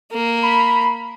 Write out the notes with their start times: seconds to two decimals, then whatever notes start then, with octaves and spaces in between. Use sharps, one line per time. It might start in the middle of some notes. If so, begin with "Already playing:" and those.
0.12 A#3
0.43 B5